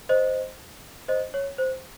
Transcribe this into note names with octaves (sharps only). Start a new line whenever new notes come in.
C5 D#5
C5 D#5
C#5
C5